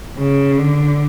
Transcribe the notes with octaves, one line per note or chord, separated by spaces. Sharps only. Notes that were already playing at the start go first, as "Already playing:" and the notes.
C#3
D3